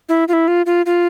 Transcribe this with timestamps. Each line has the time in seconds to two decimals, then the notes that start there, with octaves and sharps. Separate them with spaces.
0.09 E4
0.28 F4
0.33 E4
0.48 F4
0.66 F4
0.86 F4